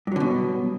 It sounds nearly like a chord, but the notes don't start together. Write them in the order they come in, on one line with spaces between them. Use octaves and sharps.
G2 F#3 D3 B2